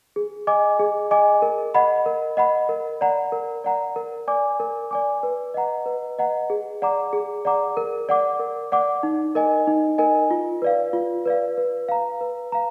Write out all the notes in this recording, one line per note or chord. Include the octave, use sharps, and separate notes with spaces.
G#4
D#5 G#5 D6
G#4
D#5 G#5 D6
A#4
D#5 F#5 B5
A#4
D#5 F#5 B5
A#4
D5 F#5 A#5
A#4
D5 F#5 A#5
A#4
D5 G#5 D6
A#4
D5 G#5 D6
B4
D#5 F#5 A#5
B4
D#5 F#5 A#5
G#4
D5 F#5 A#5 D6
G#4
D5 F#5 A#5 D6
A#4
D5 F#5 D6
A#4
D5 F#5 D6
D#4
A#4 D#5 G#5
D#4
A#4 D#5 G#5
F4
B4 D5 F5
F4
B4 D5 F5
B4
F5 A#5
B4
F5 A#5